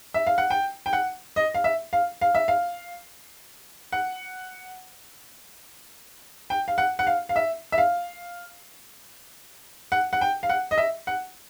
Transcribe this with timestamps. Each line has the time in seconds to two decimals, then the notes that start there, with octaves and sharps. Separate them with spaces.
0.14 E5
0.27 F5
0.38 F#5
0.50 G5
0.86 G5
0.93 F#5
1.36 D#5
1.54 F5
1.64 E5
1.93 F5
2.21 F5
2.35 E5
2.48 F5
3.92 F#5
6.50 G5
6.68 F5
6.78 F#5
6.99 F#5
7.07 F5
7.29 F5
7.36 E5
7.72 E5
7.78 F5
9.92 F#5
10.13 F#5
10.21 G5
10.43 F5
10.50 F#5
10.71 D#5
10.78 E5
11.07 F#5